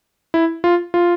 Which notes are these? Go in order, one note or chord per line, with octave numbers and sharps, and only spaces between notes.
E4
F4
F4